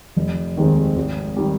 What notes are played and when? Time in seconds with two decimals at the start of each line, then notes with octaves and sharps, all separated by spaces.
0.16 F1
0.57 D#2 D#3 G#3 C4
0.96 G#1
1.36 D#3 G3